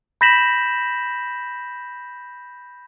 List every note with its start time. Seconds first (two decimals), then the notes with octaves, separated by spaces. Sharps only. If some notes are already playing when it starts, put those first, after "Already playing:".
0.21 B5 G6 A#6 B6 E7 F#7